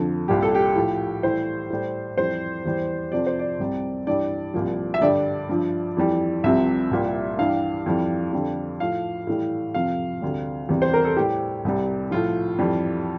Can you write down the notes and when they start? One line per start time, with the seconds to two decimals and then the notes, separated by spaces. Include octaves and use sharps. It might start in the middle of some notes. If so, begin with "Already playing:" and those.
Already playing: F2 D3 F3
0.28 C2 A#2 G3 G4
0.42 A4
0.55 G4
0.76 A2 F3
1.23 A2 E3 G3 C5
1.70 A2 G3
2.17 F2 E3 G3 C5
2.65 E2 E3 G3
3.12 F2 C3 F3 D5
3.27 C5
3.39 D5
3.59 C2 C3 G3
4.07 G2 E3 G3 D5
4.54 C2 A#2 F3
4.94 E5
5.01 G2 D3 G3 D5
5.49 G2 F3
5.97 F2 E3 G3
6.44 C2 C3 F3 E5
6.91 C2 A#2 G3
7.38 G2 E3 G3 F5
7.86 F2 E3 G3
8.32 F2 D3 G3
8.80 A2 F3 F5
9.27 A2 E3 G3
9.74 F2 C3 F3 F5
10.22 D2 C3 G3
10.69 E2 C3 G3
10.82 C5
10.94 A#4
11.05 A4
11.16 A2 G3 G4
11.65 C2 C3 G3
12.11 A2 F3 F4
12.59 F2 E3 G3